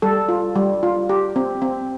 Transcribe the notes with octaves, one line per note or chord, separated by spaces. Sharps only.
G3 A4
F4
G3
F4
G4
C4
C4